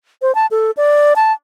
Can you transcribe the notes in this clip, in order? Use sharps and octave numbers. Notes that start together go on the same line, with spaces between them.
C5
A5
A4
D5
A5